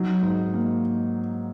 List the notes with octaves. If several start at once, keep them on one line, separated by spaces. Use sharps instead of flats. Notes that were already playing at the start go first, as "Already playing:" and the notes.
Already playing: F#3 D#4
G#2
A#3